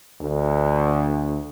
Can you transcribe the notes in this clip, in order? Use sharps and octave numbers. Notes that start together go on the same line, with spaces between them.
D2